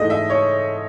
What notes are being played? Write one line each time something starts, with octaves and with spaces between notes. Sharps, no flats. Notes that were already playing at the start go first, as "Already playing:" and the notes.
Already playing: G#2 E3 A3 D#5
E5
C#5